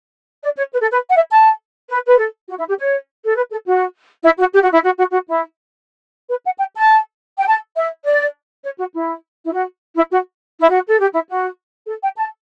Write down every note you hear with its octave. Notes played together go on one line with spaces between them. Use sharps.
D5
C#5
B4
A4
B4
F#5
E5
A5
B4
B4
A4
F#4
E4
G4
C#5
A4
B4
A4
F#4
E4
F#4
G4
F#4
E4
F#4
F#4
F#4
E4
B4
F#5
G5
A5
G5
A5
E5
D5
C#5
F#4
E4
E4
F#4
E4
F#4
E4
F#4
A4
G4
E4
F#4
A4
G5
A5